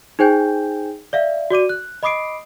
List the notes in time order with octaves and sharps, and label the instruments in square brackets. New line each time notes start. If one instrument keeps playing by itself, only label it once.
[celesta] D#4 G#4 C5 G5 G#5 G6
D5 E5 F5
F#4 D5 D6 D#7
F#6
D#5 B5 D6 D#6 C7 D7